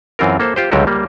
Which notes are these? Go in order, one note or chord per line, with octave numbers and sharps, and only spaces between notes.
F#2 E3 C4 F4 A#4
A#3 A4 C5
F4 G4 C5
C#2 D3 F#3 G3 F#4 G4
G3 A#3